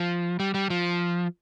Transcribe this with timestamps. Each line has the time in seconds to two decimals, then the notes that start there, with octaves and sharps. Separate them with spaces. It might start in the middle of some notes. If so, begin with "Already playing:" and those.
Already playing: F3
0.40 G3
0.54 G3
0.70 F3